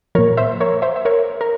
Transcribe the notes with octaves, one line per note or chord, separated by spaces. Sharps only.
A#2 F3 A#4 C#5
C5 E5
A#4 C#5
C5 E5
E5
A#4 C#5
A#4